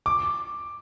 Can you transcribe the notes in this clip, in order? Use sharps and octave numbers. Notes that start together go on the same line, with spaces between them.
D6